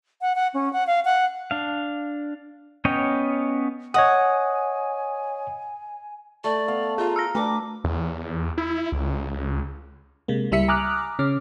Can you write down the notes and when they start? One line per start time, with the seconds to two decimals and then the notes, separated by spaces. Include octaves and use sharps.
0.22 F#5
0.35 F#5
0.54 C#4
0.73 F#5
0.87 F5
1.05 F#5
1.51 D4 F5
2.85 B3 C#4 C#5 D#5 G5
3.94 C#5 D#5 F#5 G#5 D#6
6.44 A3 D5
6.68 B3 F5
6.98 F4 G#4 A#4 F5
7.16 E6 F6 A#6
7.35 A3 D4 A#4 B4 D6
7.84 E2
8.58 E4
8.92 C#2
10.28 C3 G#3 A#3
10.52 C#2 G3 E4 E5 B6 C#7
10.68 G#5 A#5 D6 D#6 F6 F#6
11.19 C#3 C#4 D6 F6